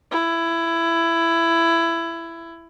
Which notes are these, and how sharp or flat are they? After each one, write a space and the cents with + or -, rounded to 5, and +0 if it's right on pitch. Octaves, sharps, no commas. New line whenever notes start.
E4 +15